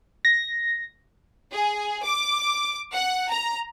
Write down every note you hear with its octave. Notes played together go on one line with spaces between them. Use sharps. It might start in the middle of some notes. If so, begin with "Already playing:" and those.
A#6
G#4
D6
F#5
A#5